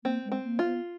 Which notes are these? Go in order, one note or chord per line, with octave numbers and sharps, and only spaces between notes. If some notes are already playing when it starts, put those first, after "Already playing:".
A#3 C4
G#3
C4
A#3
F4
B3